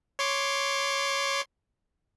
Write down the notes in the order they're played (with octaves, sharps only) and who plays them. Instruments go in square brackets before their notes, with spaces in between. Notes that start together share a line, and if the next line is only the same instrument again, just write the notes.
[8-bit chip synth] C#5 C6 D6